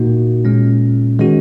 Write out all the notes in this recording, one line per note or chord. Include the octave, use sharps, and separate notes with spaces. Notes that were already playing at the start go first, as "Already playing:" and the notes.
Already playing: A#2 A#3 D#4 F#4
A#2 G#3 C#4
D#3 G#3 C#4 F#4